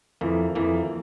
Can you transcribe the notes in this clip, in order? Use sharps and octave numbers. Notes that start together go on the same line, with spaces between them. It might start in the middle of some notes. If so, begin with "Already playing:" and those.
F2 E3 A#3
F2 E3 A#3